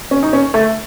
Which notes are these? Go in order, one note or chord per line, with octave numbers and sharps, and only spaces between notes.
C#4
D#4
C#4
A3